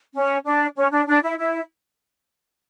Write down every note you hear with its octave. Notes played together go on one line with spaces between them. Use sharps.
C#4
D4
C#4
D4
D4
E4
E4